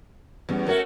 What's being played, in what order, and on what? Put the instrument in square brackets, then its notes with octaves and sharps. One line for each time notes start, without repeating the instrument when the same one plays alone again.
[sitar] E2 [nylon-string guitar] G3 B3 C#4
[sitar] A3 C#4 F#4 [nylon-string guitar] A#4 C#5 E5